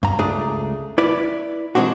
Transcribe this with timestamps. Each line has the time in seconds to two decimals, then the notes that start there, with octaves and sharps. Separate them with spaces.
0.03 G2 A#5
0.19 C#2 A3 D4 G#4 A#5
0.98 E4 B4 D5
1.75 E3 G#3 A3 C4 D4 F#4